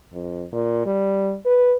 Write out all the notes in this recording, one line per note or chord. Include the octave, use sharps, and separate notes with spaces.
F2
A#2
G3
B4